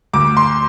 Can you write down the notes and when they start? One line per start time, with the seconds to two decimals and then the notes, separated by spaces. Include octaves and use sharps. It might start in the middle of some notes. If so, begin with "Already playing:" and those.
0.13 D2 D6
0.37 C6